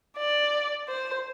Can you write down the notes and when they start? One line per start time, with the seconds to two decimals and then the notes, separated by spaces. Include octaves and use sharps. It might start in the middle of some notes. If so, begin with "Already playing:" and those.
0.17 D5
0.88 C5